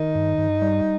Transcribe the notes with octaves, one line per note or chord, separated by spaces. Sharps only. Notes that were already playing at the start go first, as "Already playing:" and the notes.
Already playing: D#3 D#4
G2
G2
G3